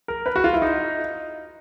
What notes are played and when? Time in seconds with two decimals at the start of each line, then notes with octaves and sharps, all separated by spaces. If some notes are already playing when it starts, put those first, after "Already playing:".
0.08 A#4
0.26 B4
0.36 F#4
0.44 F4
0.54 E4
0.62 D#4